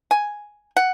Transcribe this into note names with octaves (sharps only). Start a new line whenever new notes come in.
G#5
F#5